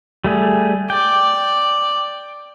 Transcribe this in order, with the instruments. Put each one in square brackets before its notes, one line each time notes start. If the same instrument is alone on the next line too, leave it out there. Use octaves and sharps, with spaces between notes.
[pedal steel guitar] G3 A3 G#4
[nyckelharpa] D5 [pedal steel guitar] G5